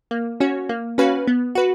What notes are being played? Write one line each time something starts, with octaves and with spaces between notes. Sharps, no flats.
A#3
C#4 F#4 C#5
A#3
C#4 F#4 B4 F5
B3
F#4 B4